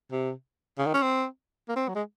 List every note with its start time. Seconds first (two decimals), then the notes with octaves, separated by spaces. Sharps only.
0.12 C3
0.78 C#3
0.86 D#3
0.94 C#4
1.02 C4
1.69 A#3
1.76 C4
1.88 F#3
1.95 G#3